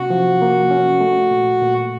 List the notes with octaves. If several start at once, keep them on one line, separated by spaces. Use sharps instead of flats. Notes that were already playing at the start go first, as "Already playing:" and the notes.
Already playing: C3 A#3 C#4 F#4
F3
A#3
C#4
A3
A#2
A#2